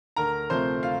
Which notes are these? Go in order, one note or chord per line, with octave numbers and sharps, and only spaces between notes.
D2 A#4 A#5
C3 F3 A3 C5 C6
F4 F5